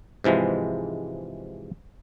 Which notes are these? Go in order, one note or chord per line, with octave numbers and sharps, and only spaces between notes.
G#2 C3 E3 F3 G#3